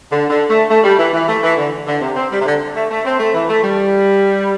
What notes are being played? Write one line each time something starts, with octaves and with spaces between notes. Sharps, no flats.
D3
D3
A3
A3
G3
E3
E3
A3
E3
D3
D3
C3
C4
G3
C3
D3
A3
A3
C4
A3
E3
A3
G3